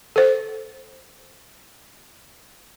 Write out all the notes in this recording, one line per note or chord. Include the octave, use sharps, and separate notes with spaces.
A4 C5